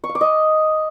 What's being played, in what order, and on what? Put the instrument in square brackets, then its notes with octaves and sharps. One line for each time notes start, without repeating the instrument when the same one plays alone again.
[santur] C#6
F5
D6
D#5